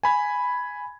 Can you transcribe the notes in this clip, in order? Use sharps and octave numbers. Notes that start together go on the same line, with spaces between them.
G#5 B5 G#6